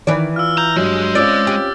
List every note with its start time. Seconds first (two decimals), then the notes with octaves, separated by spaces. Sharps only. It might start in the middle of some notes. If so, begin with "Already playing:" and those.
0.07 D#3 E3 D5
0.36 F4 E6 F6
0.58 A#5 G6
0.76 G2 F#3 G#3
1.15 C4 C#4 F4 D5 D6 E6 A6
1.47 G4